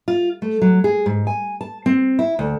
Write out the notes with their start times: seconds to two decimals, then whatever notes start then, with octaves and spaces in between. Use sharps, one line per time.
0.08 F4
0.42 A3
0.62 F#3
0.84 G#4
1.06 G#2
1.27 G#5
1.61 A5
1.86 C4
2.19 E4
2.39 D2